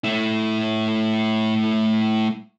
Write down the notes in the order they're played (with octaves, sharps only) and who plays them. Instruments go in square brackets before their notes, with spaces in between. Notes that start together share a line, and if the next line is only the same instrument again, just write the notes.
[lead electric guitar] A3 E4